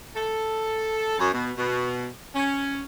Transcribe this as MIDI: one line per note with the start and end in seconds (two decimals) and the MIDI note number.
0.16 1.17 69
1.19 1.29 42
1.32 1.50 47
1.57 2.06 47
2.35 2.82 61